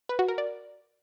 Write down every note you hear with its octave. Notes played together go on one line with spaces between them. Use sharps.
B4
F#4
A#4
D5